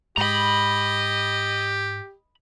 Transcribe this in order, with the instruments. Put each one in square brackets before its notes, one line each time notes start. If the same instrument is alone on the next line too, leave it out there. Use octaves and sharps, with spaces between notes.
[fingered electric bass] G#2 [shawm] G4 [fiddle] D#5 [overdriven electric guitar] A#5 B5